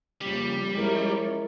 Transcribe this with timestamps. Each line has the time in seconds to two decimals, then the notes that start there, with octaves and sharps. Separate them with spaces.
0.21 F2 C#3 G3 A#3
0.74 F3 G#3 C#4 E4 A#4 C#5